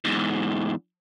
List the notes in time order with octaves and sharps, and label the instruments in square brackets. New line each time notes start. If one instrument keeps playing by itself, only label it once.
[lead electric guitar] E2 G#2